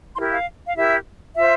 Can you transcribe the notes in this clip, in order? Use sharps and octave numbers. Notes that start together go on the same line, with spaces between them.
E4 G4 A#4 C6
F5
F5
E4 G4 A#4 E5
F4 C5 E5